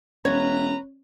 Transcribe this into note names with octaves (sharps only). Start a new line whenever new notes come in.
E1 C#4 B4 C#5 A#5